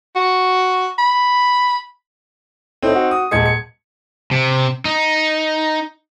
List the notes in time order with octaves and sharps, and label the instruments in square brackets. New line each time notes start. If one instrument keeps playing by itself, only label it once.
[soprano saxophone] F#4
B5
[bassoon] A2 [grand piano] C4 D#4
[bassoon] F#4
[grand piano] D#6
[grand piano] D#1 G#6 C#7 [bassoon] G#3
[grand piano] C#7
[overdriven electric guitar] C3
D#4